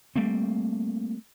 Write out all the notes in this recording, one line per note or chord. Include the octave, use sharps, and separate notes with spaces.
G3 A3 A#3 C4